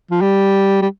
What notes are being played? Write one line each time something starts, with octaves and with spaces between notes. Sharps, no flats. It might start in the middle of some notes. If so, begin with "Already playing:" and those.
F3
G3
G3